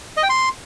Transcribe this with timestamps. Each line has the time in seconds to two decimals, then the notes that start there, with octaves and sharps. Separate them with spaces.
0.17 D#5
0.23 G5
0.29 C6